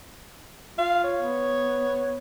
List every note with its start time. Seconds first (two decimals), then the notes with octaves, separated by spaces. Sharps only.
0.79 F4 F5
1.04 C#5
1.17 B3